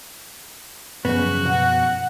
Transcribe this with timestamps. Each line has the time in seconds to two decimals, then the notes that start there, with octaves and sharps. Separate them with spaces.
1.05 F#2 C#3 F3 F#3 B3 F#4
1.45 B1 F#5